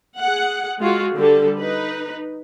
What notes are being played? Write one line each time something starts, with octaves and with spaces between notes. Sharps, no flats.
G#4 F#5
G#3 F4 F#4 G#4
D3 G3 A4
D#4 B4